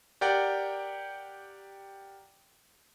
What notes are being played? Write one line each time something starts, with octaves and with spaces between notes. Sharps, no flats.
G4 A#4 D5 F#5 G5